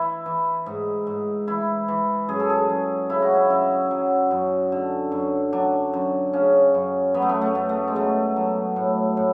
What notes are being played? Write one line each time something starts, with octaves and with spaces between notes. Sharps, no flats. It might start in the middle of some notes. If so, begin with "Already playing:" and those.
Already playing: E3 E4
E3
G#2
G#2
E3 E4
E3
F#2 G#4
A4
G#4
F#2
C#3 E4
F#4
E4
F#2 E4
F#3
F#2
D3
F#2
F#3 D4
F#2
C#3 C#4
F#2
F#3 B3
A3
B3
A3
F#2
A3
G#3
F#3 A3
F#3
A2
A2